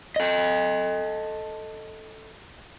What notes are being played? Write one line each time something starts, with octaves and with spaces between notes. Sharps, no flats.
A4 D#5